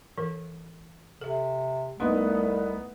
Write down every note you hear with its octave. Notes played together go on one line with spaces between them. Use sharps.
E3 A4 A#4
C3 A4 E5
C2 A3 B3 D#4 F5 C6